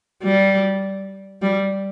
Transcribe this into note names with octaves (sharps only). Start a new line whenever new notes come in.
G3
G3